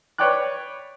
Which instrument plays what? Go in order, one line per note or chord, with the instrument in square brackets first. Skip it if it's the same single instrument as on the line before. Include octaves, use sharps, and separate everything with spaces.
[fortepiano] B4 C#5 D5 G5 D6 F#6